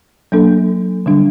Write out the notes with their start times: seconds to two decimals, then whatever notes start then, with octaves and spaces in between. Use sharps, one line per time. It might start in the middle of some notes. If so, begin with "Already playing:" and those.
0.32 F#3 A#3 D4 A4
1.06 D3 G3 D4